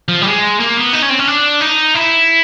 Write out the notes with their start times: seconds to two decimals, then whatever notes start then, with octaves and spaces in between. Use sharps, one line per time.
0.09 F3
0.22 G3
0.26 G#3
0.60 A#3
0.77 B3
0.93 D#4
1.02 C#4
1.10 C4
1.19 C#4
1.28 D4
1.61 D#4
1.95 E4